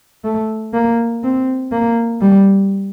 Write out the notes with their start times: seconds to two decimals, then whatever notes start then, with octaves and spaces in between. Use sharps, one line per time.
0.24 A3
0.74 A#3
1.23 C4
1.72 A#3
2.21 G3